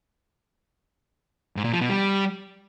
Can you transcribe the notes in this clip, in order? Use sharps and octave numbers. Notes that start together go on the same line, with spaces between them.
G#2
A#2
F3
B2
G3